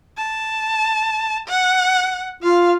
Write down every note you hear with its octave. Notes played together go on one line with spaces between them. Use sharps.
A5
F#5
F4 F5